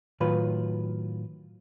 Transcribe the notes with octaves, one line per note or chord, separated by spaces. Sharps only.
A2 D#3 F#3 F4 B4